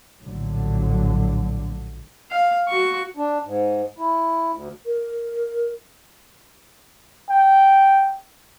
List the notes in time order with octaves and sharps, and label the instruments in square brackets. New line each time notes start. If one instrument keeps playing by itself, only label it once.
[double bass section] A#1 A2 D3 F#3
[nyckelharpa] F5
F#4 C#6
[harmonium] D4
G#2
E4
D2
[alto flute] A#4
[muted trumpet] G5